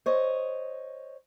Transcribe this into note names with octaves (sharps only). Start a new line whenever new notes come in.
C5 C#5 D#5